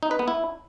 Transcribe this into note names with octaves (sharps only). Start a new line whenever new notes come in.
D#4
B4
B3
E4